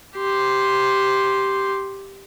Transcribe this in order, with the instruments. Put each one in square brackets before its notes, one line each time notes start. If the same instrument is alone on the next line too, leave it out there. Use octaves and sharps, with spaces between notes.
[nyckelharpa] G4 C6